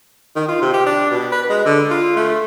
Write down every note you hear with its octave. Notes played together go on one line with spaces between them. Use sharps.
D#3
F4
C3
G4
D4
B2
B4
G#3
D3
F4
A3